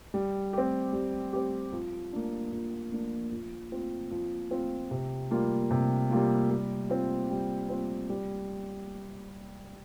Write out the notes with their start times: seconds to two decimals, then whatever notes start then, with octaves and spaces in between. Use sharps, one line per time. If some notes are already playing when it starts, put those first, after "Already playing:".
0.14 G3
0.53 C4 G4
0.93 G3
1.33 C4 G4
1.73 F3
2.12 A#3 D4
2.52 F3
2.92 A#3 D4
3.32 F3
3.72 C4 F4
4.11 F3
4.51 C4 F4
4.91 C3
5.31 G3 A#3 F4
5.71 C3
6.11 G3 A#3 F4
6.50 G3
6.90 C4 F4
7.30 G3
7.69 C4 F4
8.09 G3